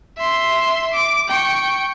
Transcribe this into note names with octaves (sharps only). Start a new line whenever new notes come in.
E5 C6
D6
G5 C#6